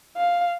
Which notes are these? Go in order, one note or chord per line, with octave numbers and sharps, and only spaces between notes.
F5